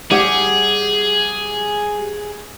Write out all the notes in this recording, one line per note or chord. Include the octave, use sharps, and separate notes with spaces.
G3 G4 G#4 F#5